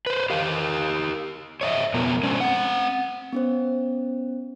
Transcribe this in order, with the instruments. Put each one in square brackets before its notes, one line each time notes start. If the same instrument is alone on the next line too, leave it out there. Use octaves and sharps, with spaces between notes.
[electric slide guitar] B4 C5
G4 A#4 F5
C#5 D#5 E5
F2 B2 B3 A#4
G#3 C#4 D4 C5
C4 F#5
[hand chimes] B3 C#4 C5